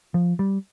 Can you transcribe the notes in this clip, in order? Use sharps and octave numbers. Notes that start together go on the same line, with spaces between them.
F3
G3